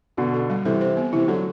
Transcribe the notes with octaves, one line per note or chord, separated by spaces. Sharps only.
B2 D3 F#4
A4
G3
C3 E3 A4
C5
B3
C3 E3 E4
D3 F#3 A4